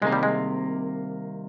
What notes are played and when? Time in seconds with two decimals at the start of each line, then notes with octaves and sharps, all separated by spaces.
0.01 C2 C3 D#3 G#3 A#3
0.12 G3
0.23 G#3